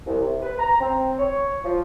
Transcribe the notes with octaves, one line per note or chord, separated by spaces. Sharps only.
C2
C3
B4
A#5
C4
C#5
F3